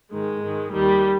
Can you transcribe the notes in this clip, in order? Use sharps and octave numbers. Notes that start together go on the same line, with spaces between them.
G#2 D#3 G#3
G#2 D#3
D#2 D#3 G3